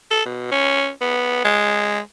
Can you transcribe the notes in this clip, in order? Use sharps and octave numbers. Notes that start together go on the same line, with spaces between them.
A4
B2
C#4
B3
G#3